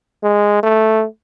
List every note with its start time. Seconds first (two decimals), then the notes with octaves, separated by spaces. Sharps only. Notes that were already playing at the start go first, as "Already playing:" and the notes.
0.23 G#3
0.63 A3